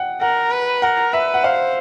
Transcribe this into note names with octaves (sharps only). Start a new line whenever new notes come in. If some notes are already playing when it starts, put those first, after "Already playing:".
Already playing: F#5 G5
A#4 F#5
B4
A#4 F#5
B4 E5
F#5
C5 F5